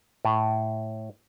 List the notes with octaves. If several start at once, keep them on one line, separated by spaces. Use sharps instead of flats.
A2